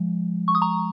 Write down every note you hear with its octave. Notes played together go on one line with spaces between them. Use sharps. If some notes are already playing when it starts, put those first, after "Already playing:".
Already playing: F3 G#3
C#6
D#6
A#5 C#6